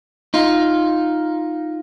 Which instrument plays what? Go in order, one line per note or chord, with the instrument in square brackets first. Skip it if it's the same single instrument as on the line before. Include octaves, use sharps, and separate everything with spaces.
[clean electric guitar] D#4 F4